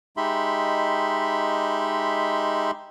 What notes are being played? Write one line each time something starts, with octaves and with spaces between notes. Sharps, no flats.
G#3 D#4 G4 E5 B5 C6